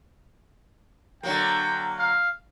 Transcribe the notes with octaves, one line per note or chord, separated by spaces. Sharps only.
D3 F#3 A#3 G5
F5